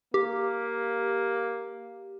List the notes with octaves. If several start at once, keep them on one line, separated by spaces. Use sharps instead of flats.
A#3 G4